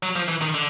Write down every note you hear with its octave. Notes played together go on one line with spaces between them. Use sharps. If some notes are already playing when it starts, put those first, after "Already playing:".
F#3
F3
E3
D#3
D3